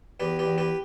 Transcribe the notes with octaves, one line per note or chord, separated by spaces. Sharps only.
E2 G4 B4
G4 B4
E2
G4 B4